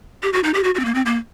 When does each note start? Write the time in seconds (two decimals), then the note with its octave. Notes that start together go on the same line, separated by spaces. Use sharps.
0.23 G4
0.33 F#4
0.44 D#4
0.54 G4
0.64 F#4
0.75 F#4
0.80 C4
0.85 A#3
0.95 C4
1.06 A#3